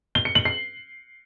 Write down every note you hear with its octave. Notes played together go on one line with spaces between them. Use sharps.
G7
C#7
F#7
C7